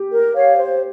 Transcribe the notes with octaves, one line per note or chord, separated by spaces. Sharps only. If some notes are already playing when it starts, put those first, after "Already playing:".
Already playing: G4
A#4
C#5 F5
C5